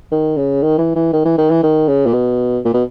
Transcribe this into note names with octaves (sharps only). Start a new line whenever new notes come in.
D#3
C#3
D#3
E3
E3
D#3
E3
D#3
E3
D#3
C#3
A#2
B2
A#2
B2